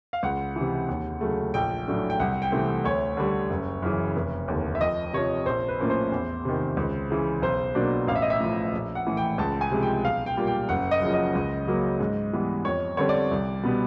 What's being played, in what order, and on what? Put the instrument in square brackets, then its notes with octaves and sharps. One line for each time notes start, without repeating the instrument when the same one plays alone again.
[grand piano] F5
C#2 F#5
C3 E3
D#2
C#3 F#3 A3
A#1 G5
A2 F#3 A3 D4
G5
C2 F#5
G5
C3 E3 A3 C4
D2 C#5
D3 G3
F#1
F#2 C#3 E3
F1
D#2 D3
E5
F2 D#5
C3 F3 C#5
A#1 C5
B4
A2 F3 A#3 C#4
C5
E2
C3 D#3
C#2
C#3 E3
B1 C5
B2 F#3 A#3 D4
A1 F5
E5
D#5
E5
A2 F3
A#1
F#5
A2 E3
G5
C#2 A5
G#5
C3 F3 G#3
G5
B1 F5
G5
A#2 G3 A#3
G5
F#1 F#5
D#5
F#2 C#3 F3
D#5
C#2
C#3 F#3 A#3
G#2
E3 G3 B3
F2 C#5
D3 G3 C4 C#5
D5
C2
B2 G3 B3